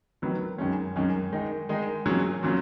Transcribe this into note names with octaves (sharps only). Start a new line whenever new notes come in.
D#3 F#3 B3
F#2 D#3 G#3 C#4
F#2 D#3 G#3 C#4
D#3 G#3 D#4
D#3 G#3 D#4
A#2 F#3 C#4 G#4
A#2 F#3 C#4